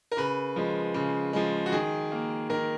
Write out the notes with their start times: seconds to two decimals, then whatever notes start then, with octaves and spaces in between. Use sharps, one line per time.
0.12 A#4
0.17 C#3 B4
0.56 F3 G#3
0.94 C#3
1.33 F3 G#3
1.66 F#4
1.72 D#3 G#4
2.12 A#3
2.50 D#3 A#4